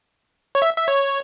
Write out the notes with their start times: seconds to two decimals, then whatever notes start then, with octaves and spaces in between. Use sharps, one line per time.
0.55 C#5
0.62 E5
0.77 E5
0.88 C#5